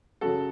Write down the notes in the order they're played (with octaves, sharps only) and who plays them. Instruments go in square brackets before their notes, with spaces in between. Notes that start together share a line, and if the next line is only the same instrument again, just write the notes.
[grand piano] F#2 C#3 F#3 F#4 A4